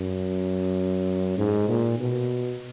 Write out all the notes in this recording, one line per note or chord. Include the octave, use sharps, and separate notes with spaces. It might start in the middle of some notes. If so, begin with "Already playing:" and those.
Already playing: F#2
G#2
A#2
B2